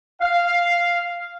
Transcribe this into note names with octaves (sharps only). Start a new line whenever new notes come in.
F5